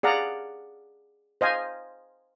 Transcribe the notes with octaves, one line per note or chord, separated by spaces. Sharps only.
G#4 D5 F5 F#5 A#5
C5 D#5 F5 G#5